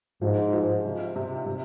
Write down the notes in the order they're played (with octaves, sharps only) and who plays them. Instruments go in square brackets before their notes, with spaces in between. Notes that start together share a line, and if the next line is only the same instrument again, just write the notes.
[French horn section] G#2 [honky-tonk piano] F3
[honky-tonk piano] F3
C3
C3
C3